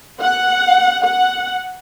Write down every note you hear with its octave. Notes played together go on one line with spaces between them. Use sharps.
F#5
F#5